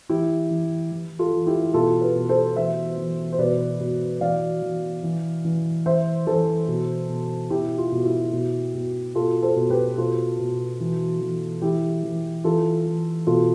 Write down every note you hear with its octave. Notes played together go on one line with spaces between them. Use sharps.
E3 E4 G4
E3
E3
F4 A4
E3
E4 G4
B2 F4 A4
G4 B4
B2
A4 C5
E3 C5 E5
E3
C5
B2 B4 D5
B2
E3 D5 F5
E3
E3
E3
E3 C5 E5
E3 A4 C5
B2
B2
B2 E4 G4
F4
B2
E4 G4
B2
B2
B2 F4 A4
A4 C5
B2
G4 B4
B2 F4 A4
B2
E3
E3
E3 E4 G4
E3
E3 F4 A4
E3
B2 F4 A4